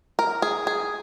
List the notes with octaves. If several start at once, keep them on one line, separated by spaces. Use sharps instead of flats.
A#4
G#4
G#4